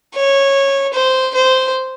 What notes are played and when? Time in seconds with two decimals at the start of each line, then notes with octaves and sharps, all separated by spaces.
0.14 C#5
0.93 C5
1.35 C5